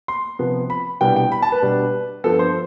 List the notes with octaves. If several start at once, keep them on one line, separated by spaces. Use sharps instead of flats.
C6
C3 F3 B3
B5
C2 B2 G3 B3 D4 G5
G5
B5
A5
B4
B2 G3 D4
G2 F3 B3 A4
C5